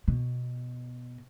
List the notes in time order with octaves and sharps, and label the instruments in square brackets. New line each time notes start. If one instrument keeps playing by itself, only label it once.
[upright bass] B2